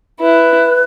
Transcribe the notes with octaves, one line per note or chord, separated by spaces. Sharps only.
E4 B4